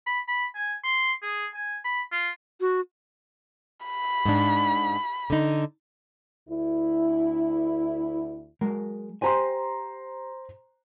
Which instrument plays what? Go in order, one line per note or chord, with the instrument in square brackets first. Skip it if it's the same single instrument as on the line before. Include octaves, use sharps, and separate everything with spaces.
[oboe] B5
B5
G#5
C6
G#4
G#5
B5
F4
[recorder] F#4
[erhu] B5
[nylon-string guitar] G#2 D4
D3 D#4
[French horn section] D2 E4
[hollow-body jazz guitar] F#3 G#3 A#4
[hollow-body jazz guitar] G4 G#5 [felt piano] C5 A#5 C6